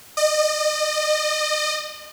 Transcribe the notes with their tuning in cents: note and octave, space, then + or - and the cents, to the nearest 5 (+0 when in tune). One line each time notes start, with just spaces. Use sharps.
D#5 -35